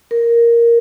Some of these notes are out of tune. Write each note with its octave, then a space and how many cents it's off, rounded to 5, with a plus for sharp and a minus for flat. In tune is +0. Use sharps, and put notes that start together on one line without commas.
A#4 +0